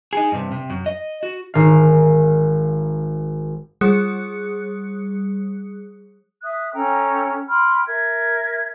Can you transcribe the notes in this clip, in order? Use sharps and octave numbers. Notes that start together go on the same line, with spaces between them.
D#4 G#4
G2 C3
C3
F#2
D#5
F#4
G#1 F5
G3 G#4 D#6 F#6 C#7
E5 D#6 F#6
C#4 A4 G5 A#5
G5 B5 C6 F6
A#4 E5 G#6